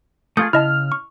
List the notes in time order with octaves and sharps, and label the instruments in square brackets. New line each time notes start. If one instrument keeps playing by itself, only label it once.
[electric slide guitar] A3 F4 G#4 [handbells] D#6 G6
[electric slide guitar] C#3 [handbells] E4 D#5 A5 [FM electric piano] F6
[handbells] C#6